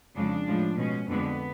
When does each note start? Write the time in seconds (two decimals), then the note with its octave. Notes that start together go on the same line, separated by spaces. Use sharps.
0.15 F2 C#3 F3 G#3 D4
0.47 A2 F3 G#3
0.78 B2 G#3 C#4
1.09 F2 D3 G#3 B3